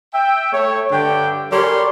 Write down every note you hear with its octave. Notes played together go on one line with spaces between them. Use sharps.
E5 G5
A3 C#5
G2 D3 D4 G4 G5
G3 A#4 C#5 G#5 C6